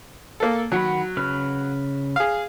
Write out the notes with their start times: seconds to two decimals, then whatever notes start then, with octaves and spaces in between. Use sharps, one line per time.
0.40 A#3 A4
0.72 D#3 F#3 F#5 B5
1.17 C#3 B4 F6
2.16 G#4 F5